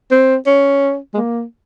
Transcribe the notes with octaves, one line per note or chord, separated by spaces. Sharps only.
C4
C#4
G#3
A#3